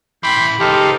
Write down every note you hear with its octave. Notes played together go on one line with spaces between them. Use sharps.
A2 E3 G5 B5 C6
C#2 D#4 G4 A4 C5 F5